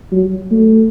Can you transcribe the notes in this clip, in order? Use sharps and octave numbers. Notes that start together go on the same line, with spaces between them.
F#3
A3